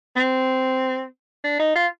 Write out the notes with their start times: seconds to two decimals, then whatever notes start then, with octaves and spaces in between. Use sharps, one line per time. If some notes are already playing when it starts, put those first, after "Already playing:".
0.16 C4
1.44 D4
1.59 D#4
1.75 F4